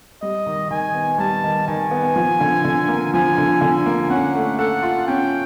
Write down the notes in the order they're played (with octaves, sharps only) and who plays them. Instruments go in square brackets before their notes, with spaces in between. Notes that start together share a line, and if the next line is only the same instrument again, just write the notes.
[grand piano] G3 [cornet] D#5
[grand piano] D#3
[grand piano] D#3 [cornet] G#5
[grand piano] B3
[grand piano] G3 [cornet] A5
[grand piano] D#3
[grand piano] D#3 [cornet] G#5
[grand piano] B3
F3
D3
D3
A#3
[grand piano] F3 [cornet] G#5
[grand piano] D3
[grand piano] D3 [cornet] G#5
[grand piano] A#3
[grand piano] C#4 [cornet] F#5
[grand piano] A3
[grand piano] A4 [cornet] F#5
[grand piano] F4
[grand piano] C#4 [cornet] G5